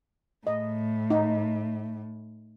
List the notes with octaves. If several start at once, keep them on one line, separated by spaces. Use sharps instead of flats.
A2 D#5
D#4